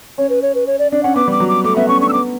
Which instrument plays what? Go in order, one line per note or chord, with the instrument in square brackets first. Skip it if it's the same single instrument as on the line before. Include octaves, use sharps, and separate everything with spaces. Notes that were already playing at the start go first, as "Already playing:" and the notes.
[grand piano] C#4 [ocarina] C#5
[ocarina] B4
C#5
B4
C#5
D5
[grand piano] D4 [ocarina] D5
[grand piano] C#4 [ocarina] F#5
[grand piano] B3 [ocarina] D6
[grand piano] G3 [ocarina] D6
[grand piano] F#3
[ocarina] D6
[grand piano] A3 [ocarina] D6
[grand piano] B3 [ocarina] E5
[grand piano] C#4 [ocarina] C#6
[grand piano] D4 [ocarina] C#6
[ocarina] E6
[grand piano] B3 [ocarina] D6